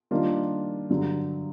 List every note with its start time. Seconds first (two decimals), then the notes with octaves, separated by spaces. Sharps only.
0.11 D#3 G3 A#3 D4 F4
0.89 G2 D3 F#3